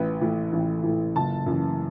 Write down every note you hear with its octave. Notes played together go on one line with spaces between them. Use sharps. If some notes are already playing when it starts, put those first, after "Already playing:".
Already playing: A1 B4
A2 E3
A1
A2 E3
F#1 A5
F#2 E3